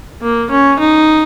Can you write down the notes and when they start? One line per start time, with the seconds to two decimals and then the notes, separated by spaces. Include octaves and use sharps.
0.22 A#3
0.50 C#4
0.79 D#4